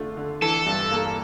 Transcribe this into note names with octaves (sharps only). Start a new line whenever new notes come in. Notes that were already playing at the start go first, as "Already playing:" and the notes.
Already playing: D3 A3 D4 F4
D3
E3 A4
G2
A#3